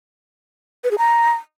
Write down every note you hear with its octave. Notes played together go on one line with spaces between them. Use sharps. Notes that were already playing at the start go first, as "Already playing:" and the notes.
B4
G#4
A#5